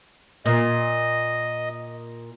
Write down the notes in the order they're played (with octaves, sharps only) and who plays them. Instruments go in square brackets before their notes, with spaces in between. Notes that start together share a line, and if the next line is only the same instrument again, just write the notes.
[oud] A#2 [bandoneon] D#5